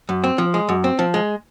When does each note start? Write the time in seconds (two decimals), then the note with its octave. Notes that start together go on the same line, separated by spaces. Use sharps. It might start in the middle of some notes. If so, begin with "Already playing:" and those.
0.09 F#2
0.24 C4
0.38 F3
0.54 G#3
0.69 F#2
0.84 C4
0.99 F3
1.14 G#3